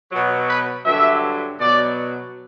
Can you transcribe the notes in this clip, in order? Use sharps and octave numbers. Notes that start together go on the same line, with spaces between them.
B2 F#3
B4
G2 D3 F#3 E5
B2 F#3 D5